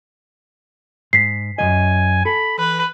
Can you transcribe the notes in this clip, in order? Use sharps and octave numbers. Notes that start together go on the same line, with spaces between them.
G#2 B6 C7
F#2 D#3 D#5 G#5
A4 B5
E3 B4